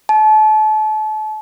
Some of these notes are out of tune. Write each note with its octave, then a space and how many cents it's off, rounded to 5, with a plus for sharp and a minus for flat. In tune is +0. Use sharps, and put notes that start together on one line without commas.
A5 -35